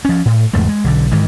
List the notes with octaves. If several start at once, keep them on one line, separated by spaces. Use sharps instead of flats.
F3 C#4
A2
F1 E2 G#2 A3
G#3
B1 D3
G#2 D#3 E3